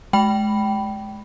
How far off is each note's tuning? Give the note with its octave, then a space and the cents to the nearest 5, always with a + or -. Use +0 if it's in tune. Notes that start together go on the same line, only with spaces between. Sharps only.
G#3 +30 G5 -15 B5 +0